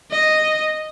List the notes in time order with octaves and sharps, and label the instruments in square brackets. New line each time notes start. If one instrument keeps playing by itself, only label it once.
[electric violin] D#5